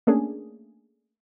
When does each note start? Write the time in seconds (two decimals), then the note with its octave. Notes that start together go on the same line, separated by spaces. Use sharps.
0.07 A3 A#3 C#4 D4 G#4